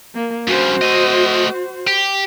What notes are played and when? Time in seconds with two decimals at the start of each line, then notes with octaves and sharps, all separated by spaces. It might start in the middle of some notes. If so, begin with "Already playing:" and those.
0.15 A#3
0.47 G2 C#3 F#4 C5
0.82 A3 D#5
1.87 G4